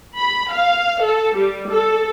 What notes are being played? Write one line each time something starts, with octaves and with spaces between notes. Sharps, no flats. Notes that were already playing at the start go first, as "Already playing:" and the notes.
B5
F5
A4
G3
A4